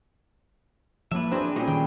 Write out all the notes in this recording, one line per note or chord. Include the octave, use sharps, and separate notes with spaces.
A2 F3 A#3 B4 E5 A5 D6
F#3 C4 D4 G#4 D5 A#5
A#2 G3 A3 A#3 C#4 D#4 G#4
D#3 G5